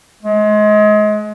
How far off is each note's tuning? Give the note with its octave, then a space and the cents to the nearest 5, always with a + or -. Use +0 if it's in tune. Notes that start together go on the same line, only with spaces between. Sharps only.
G#3 +30